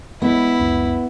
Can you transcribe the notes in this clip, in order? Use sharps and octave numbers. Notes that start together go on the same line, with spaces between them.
G#3 B3 E4
C#2 F#2